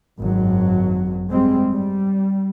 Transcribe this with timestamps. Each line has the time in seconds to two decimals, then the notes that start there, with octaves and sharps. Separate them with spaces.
0.19 G#1 F#2 F#3
1.31 G3 G#3 C4
1.73 G3